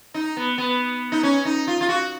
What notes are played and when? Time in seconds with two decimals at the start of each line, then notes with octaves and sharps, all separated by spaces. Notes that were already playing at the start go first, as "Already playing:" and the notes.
0.14 D#4
0.37 B3
0.58 B3
1.12 D#4
1.23 C#4
1.45 D#4
1.67 F4
1.81 F4
1.89 F#4